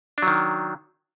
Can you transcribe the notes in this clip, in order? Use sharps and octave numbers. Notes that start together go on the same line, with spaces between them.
D#3 F#3 D4